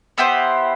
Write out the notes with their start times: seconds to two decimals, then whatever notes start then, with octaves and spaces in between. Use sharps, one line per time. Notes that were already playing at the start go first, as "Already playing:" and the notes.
0.18 B3 E4 G4 C5